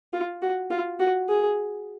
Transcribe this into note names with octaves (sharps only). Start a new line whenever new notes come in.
F4
F#4
F4
F#4
G#4